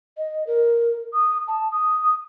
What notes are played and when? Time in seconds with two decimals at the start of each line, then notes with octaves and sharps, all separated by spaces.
0.17 D#5
0.47 A#4
1.13 D#6
1.48 A5
1.72 D#6